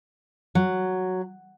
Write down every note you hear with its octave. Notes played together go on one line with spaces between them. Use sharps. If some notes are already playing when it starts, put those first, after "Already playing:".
F#3